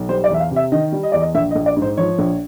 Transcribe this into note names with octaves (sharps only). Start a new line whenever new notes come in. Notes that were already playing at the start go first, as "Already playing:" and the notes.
Already playing: B1
G3 C5
D5
E2 E5
F5
C3
E5
D#3 D#5
G3
D#5
E2 D5
D#5
A#1 E5
D#5
A#1
D5
G#2
C5
F3 C#5
A#1